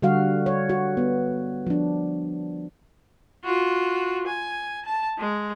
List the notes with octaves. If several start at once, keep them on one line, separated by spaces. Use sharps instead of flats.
D3 G3 F#4 F5
C#5
F#4
B3
F3 D4
F4 F#4
G#5
A5
G#3